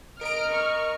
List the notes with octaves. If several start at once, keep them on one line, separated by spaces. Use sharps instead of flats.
A#4 D#5 A#5 F6 D7
C#6